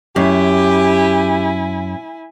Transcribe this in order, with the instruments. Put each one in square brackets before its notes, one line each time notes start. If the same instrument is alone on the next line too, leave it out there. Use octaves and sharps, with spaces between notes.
[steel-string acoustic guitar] F#2 [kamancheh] E4 G#5 [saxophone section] G4